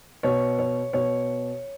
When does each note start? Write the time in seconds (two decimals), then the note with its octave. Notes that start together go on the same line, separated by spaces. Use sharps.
0.23 B2 C#5
0.59 C#5
0.93 B2 C#5